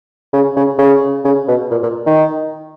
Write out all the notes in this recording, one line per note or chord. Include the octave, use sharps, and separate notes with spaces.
C#3
C#3
C#3
C#3
B2
A#2
A#2
D#3